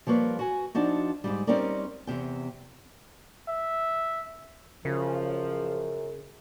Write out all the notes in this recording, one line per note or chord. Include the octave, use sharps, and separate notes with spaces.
F3 G3 A#3 B4 C#5
F#4 G#5
F3 D4 D#4 F#4
G#2 C#3 G3
G3 C4 C#4 D#4 A#4 D5
E2 G2 C3 G5
E5
F#2 C#3 F3